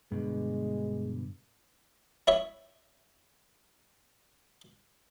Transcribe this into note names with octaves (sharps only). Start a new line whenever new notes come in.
G2 B2 D3 G#3
E4 C#5 E5